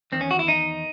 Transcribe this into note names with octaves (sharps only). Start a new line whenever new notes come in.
E2 D#3 C4
C#4
F#4
E4
D#4